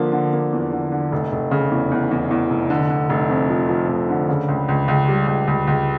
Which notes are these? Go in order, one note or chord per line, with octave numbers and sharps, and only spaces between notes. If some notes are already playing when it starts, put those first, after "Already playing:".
Already playing: D3 F3 A#3
D3
A#3
E2
D3
D3
F1
F1
C#3
E2
E2
E2
E2
F1
D3
D3
F1
F2
F3
F3
F1
D3
C#3
C#2
C#2
C#2
G3
C#2
C#2
C#2